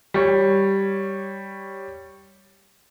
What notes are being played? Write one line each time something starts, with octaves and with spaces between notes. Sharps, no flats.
G3 C#5